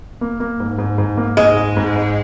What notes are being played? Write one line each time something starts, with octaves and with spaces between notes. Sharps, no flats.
A#3
A#3
G#2
G#2
G#2
A#3
G#2 G#3
G#2
G#2
G#2